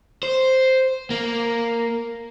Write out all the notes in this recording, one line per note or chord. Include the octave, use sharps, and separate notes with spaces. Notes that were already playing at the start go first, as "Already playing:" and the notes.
C5
A#3